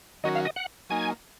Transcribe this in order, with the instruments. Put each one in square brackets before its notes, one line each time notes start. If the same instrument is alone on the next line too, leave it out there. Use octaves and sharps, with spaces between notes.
[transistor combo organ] D#3 F#3 C#4 F#4 A#4 [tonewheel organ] D#5
[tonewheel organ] F5
D#5
F#5
[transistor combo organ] F#3 A#3 D#4 [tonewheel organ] G#5